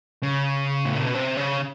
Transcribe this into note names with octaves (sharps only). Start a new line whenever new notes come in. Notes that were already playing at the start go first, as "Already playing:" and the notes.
C#3
A2
A#2
B2
C3
C#3